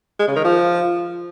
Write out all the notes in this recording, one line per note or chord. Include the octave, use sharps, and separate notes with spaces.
G#3
C#3
D#3
F3